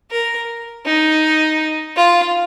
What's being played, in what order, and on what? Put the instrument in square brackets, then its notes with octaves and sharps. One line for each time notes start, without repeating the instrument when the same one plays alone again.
[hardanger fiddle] A#4
D#4
F4